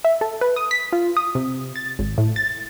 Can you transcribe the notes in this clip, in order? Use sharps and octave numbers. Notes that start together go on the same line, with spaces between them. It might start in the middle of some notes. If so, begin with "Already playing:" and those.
E5
A4
B4
D#6
B6
F4
D#6
C3
A6
G#1
A2
A6